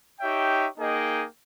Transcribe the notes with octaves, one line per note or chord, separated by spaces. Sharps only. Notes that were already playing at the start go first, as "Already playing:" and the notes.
D#4 G4 C#5 E5 G5
A#3 D#4 G#4 D#5 G5